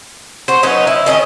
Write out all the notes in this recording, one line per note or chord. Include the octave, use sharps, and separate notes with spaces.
F#4 C5
F#3 B3 C#4 D#4
E4
D#3 C#4 D#4 D#5